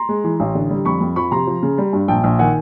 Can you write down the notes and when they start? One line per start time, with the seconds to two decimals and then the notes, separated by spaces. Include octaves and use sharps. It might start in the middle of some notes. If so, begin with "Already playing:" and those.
Already playing: A#5 C6
0.09 G#3
0.24 E3
0.40 A1
0.55 D3
0.70 G3
0.85 F2 B5 C#6
1.01 F2
1.16 F3 B5 C#6
1.32 C3 A#5 C6
1.47 F3
1.63 C#3
1.78 G3
1.93 G2
2.08 A#1 G5 A5
2.24 A#1
2.39 D#3 F#5 G#5